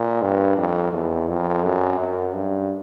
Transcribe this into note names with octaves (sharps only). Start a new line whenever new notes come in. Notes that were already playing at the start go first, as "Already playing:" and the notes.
Already playing: A#2
G2
F2
E2
F2
F#2
F#2
G2